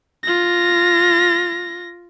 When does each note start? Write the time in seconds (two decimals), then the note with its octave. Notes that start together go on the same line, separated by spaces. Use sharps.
0.23 F4 A#6